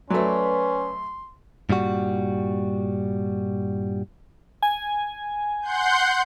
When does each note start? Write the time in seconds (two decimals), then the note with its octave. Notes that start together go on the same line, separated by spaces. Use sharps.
0.10 F#3 A3 C#4 B4 D5 C6
1.69 G2 A#2 G3 F#4
4.63 G#5
5.62 F#5 C6 G6